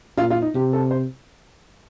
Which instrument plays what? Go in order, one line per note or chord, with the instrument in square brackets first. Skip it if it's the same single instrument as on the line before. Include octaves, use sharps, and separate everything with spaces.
[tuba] A#2 [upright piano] F4
[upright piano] F4
D#4
[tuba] C3 [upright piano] G4
[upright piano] A4
C5